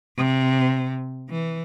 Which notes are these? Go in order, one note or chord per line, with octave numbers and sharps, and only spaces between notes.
C3
E3